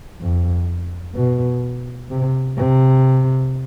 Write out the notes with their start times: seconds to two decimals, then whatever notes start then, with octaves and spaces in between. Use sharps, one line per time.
0.21 F2
1.16 B2
2.11 C3
2.58 C3